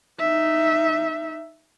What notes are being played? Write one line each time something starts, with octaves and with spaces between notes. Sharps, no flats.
D#4 E5